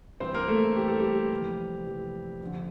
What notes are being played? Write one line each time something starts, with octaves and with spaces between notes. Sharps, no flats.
G2 E3 C4 C5
A#3 A#4
A3 A4
G2 E3 G4
A4
G3 G4
F2 C3 E3
F2 C3 E3
F2 D3